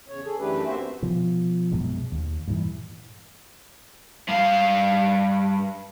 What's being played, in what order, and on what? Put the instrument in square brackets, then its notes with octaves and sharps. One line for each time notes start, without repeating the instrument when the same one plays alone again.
[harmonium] E2 C#3 C#5
G#4 A4
F#2 E3 A3 D4 G4 B4
A#3 C4 F#4 C5 E5
[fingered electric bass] B2 F3
A#1 F#2 B2 G#3
D#2
G2 A#2 D#3 E3
[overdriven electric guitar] G2 F5